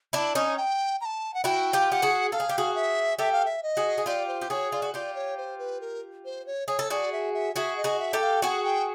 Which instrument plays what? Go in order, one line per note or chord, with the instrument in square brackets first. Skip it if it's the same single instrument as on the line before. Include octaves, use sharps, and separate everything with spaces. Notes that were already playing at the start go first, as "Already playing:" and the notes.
[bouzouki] D4 E4 [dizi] A5
[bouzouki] C#4 D#4 [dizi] G#5
[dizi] G5
A#5
A5
F#5
[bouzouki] E4 F#4 [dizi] G5
[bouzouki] F4 G4
[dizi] G5
[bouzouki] G4 [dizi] F#5
[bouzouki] F#4 G#4
[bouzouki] A4 [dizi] F5
[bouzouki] G#4
G4
F#4 G#4
[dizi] E5
[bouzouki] G4 A4 [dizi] E5
[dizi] F5
E5
D#5
[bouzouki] F#4 G#4
G#4
[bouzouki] F4 G4 [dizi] D5
[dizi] C5
[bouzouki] G4
[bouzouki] F#4 G#4 [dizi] C#5
[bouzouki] F4 [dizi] D5
[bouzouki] F#4
[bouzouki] F4 G4 [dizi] D5
[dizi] C#5
C5
B4
A#4
C5
C#5
[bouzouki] G#4 [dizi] C#5
[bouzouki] A4
[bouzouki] F#4 G#4 [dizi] D5
[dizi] E5
E5
[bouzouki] F#4 G#4 [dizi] E5
[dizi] D#5
[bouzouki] F#4 G#4
[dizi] E5
[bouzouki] G4 A4
[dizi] F5
[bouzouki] F#4 G#4 [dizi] F#5
[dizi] G5